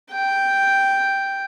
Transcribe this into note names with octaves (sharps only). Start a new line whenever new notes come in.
G5